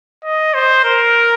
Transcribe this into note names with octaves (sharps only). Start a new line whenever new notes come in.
D#5
C5
A#4